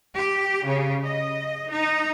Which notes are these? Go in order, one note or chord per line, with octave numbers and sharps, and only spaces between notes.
G4
C#3
D#5
D#4